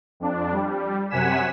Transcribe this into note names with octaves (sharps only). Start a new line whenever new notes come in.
F2 D4
G3
F#2 C3 F#5 G#5 B6 E7